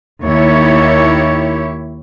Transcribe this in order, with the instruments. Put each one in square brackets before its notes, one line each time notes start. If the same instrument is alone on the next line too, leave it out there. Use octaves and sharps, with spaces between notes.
[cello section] D#2 E4 G4 C#5